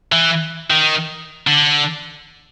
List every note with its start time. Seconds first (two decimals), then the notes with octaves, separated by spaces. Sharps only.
0.12 E3
0.71 D#3
1.47 D3